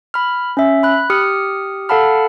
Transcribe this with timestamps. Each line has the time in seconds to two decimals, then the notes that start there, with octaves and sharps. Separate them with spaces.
0.14 B5 F6
0.57 C#4 E5
0.83 B5 F#6
1.10 G4 D#6 F6 C#7
1.89 A4 F5 F#5 A5 B5 F6